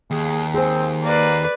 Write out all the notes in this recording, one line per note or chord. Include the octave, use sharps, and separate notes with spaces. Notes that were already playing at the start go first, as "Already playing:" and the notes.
D#2 G#4
C4 G#4 C5
A#3 B4 D5